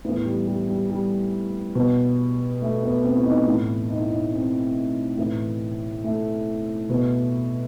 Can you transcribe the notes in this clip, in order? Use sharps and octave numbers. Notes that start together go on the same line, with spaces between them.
A2 E3 B3
G3
G3
G3
G3
B2
A3
B3
C4
E4
D#4
A2 E3 E4
D#4
E4
D#4
C4
A2 E3
A3
B2